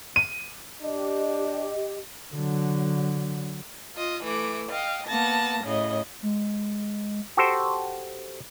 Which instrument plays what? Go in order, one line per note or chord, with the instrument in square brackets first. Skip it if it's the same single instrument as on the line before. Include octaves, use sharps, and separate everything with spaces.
[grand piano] D#7
[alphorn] D4 [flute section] G4 D#5
[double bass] D3 F#3
[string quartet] F4 D#5
E3 A3 D6
D#5 F5 G5
A#3 B3 A5 A#6
A2 C#3 D#5
[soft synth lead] G#3
[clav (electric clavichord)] F#4 G4 A4 C5